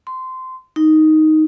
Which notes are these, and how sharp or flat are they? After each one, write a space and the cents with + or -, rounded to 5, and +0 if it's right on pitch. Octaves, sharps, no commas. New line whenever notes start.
C6 -20
D#4 +5